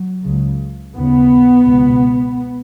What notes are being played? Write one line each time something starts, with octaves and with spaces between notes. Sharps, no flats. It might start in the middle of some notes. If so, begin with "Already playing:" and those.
Already playing: F#3
C#2 C#3
D#2 C#3 B3
C#2 B2